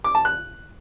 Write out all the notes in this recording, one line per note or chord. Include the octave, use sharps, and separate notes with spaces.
D6
A5
F#6